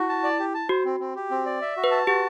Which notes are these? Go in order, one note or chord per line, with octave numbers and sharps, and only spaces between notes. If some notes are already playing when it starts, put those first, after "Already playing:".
Already playing: E4 F#4
A5
D5
G4
A5
F#4 C5
C4
C4
G4
C4
D5
E5
F#4
B4
A5
F#4 G4